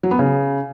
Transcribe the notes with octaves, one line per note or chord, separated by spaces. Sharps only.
F#3
B3
C#3